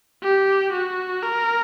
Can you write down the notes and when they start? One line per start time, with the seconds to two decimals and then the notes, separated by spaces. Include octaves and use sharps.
0.22 G4
0.73 F#4
1.23 A#4